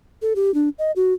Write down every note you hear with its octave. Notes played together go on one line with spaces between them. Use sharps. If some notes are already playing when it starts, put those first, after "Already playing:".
A4
G4
D4
D#5
F#4